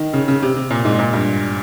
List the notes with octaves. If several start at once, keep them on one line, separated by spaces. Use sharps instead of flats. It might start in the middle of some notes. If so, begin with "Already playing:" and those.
Already playing: D#3
C#3
C#3
C3
C3
A#2
G#2
A#2
G2